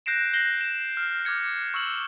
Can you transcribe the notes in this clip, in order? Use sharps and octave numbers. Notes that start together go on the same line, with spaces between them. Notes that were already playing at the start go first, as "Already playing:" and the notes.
F#6 G6 A#6 C7 D7 E7
F#6 G6 A#6 C7 F#7 G7
E7
F6
D6 F6 G#6 C#7
C#6 E6 F6 F#7